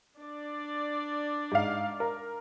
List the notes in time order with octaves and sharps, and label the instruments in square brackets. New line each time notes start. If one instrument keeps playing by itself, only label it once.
[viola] D4 D5
[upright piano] G#2 F5
A#4